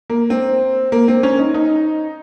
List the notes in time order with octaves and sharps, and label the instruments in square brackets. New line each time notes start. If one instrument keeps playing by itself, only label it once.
[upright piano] A#3
C4
A#3
C4
C#4
D#4
D#4